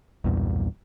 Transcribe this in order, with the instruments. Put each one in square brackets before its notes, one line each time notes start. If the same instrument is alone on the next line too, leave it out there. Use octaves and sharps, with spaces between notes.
[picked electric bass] B1 E2 G2 A#2